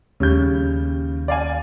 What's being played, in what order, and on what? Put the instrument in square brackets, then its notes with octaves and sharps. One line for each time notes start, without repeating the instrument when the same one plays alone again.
[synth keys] D#2 [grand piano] C#3 G3 G6
[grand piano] D5 F5 G#5